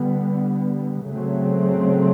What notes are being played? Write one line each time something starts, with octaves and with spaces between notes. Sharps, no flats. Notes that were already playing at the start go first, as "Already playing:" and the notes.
Already playing: D3 G3 B3
C#3 F#3 A3 C4